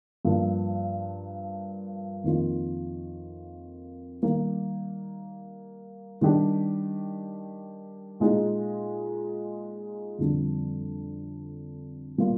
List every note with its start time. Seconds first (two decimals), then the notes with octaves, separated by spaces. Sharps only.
0.25 G2 F3 A#3
2.24 F2 D#3 A#3 F4
4.22 D#3 G3 A#3
6.21 D#3 G3 D4 G4
8.20 A#2 G#3 D#4 G#4
10.18 F2 D3 G3
12.18 A#2 G3 A#3 F4